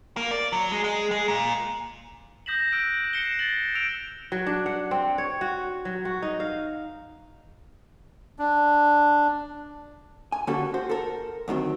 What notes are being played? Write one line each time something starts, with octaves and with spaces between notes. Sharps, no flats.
A#3
D5
F#3
G#3
G#3
G#3
A#2
D#6 G6 A#6 B6 E7 F#7
E6 F#6 D7
C7 C#7 E7 G7
A6 F#7
E6 D7 F7
F#3
D4
F#5
C4
C#5
F#4
F#3
F#4
D#4
F5
D4
G#5
D3 A#3 C#4 F#4 G4 A4
F#4 C5
A4 A#4
D2 D#3 F#3 C4